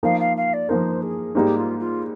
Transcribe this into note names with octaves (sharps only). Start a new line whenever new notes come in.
F3 A#3 D#4 A#4 F5
F5
F5
D5
F3 A#3 D#4 A#4 C5
G#4
G#2 G3 A#3 D#4 G4
F4
F4